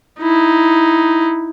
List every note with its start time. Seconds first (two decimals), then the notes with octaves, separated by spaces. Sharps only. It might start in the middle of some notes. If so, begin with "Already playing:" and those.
0.20 D#4 E4